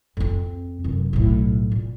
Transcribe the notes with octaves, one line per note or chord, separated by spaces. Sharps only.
F2 C4
F1 F#2
B1 A2
A#1